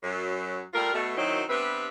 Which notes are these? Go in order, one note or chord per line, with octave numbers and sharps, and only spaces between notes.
F#2 F#3
G3 A3 F4 A#4
B2 A3
F#2 D#3 F#3 C4 D#4 E4
G2 B3 C4 G4 B4 E5